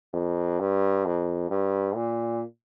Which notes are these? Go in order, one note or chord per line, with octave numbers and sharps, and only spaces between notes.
F2
G2
F2
G2
A#2